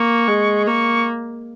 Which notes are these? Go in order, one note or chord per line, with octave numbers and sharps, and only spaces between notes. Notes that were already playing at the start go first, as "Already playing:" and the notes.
Already playing: A#3 C#6
G#3
A#3 C#6